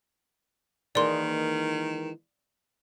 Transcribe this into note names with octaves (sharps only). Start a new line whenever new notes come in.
D#3 E3 G#3 A#3 D5 C6